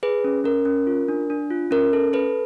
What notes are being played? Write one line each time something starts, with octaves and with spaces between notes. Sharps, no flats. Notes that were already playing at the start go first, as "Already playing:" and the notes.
G#4 B4
C#4
C#4 A#4
C#4
F4
D4
D4
F4
C#4 A#4
A4
A4 B4